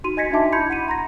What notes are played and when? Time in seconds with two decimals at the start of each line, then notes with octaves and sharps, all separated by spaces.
0.04 D#4 F#4 C6 D#7
0.17 D#5 G#5 G#6 A#6 B6 C#7
0.31 D4 D#4 F#4 E5 A5 D6
0.53 E4 B5 C6 G6 G#6 C#7
0.70 F#5 C#7 D#7
0.88 A#5 C6 A#6